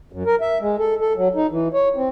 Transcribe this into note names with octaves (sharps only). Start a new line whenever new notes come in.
F#2
A#4
E5
G#3
A4
A4
F#3
D#4
E3
C#5
C4